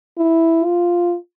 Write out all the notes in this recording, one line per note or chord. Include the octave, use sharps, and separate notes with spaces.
E4
F4